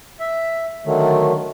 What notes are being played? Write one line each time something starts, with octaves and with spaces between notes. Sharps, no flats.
E5
D3 D#3 F#3 A3